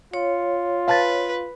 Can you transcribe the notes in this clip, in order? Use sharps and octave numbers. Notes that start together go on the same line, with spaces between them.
F4 C#5
B4 F5 A5 A6